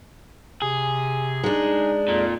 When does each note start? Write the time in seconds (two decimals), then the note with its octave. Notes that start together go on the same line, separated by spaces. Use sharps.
0.62 C3 G#4
1.44 G#3 D4 D#4
2.08 F2 A#2